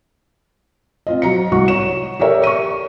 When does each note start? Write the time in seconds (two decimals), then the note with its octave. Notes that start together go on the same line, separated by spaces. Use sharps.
1.07 C4 F4 D#5
1.22 F#3 A#5 C#7
1.51 C2 F#4 C#6
1.68 C#5 E7
2.19 G4 A4 A#4 C#5 E5
2.44 C#6 D#7